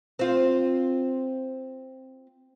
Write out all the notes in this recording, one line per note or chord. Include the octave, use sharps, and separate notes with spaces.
C4 F4